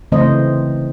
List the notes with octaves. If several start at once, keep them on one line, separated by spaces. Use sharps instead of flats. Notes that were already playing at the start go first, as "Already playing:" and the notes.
C#3 E3 A3 C4 C5 D#5